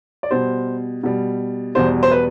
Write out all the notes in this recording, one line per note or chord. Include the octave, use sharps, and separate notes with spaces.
D5
B2 G3 C5
B2 G3
E2 B2 G3 C5
C5
B4